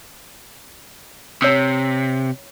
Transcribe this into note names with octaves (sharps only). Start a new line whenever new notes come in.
C3 C#5 E6